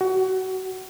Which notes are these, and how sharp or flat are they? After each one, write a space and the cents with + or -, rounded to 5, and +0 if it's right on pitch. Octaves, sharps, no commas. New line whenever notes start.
F#4 +25